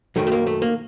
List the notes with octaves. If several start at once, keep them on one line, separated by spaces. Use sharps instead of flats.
F#2 D#3 F#3 A3
A3
A#3
A3
A#3